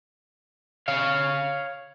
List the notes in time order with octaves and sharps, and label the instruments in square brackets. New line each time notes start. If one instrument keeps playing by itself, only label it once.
[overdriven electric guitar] C#5 F5